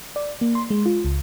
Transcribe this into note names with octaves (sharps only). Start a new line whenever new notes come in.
D5
A#3
C6
G#3
F4
C#2